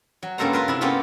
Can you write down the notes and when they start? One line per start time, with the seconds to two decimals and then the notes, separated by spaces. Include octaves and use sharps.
0.23 F#3
0.38 G2 C#3 A#3 A4 C5 A#5
0.53 F4 A#4 B4
0.68 C3 E4
0.81 A#3 B3 C#4 F4 G4 A4